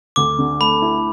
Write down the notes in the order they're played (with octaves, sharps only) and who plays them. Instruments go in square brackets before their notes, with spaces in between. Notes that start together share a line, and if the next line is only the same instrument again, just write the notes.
[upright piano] D2 [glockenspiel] D6
[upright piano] D3
[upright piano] A3 [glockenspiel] B5
[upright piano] E4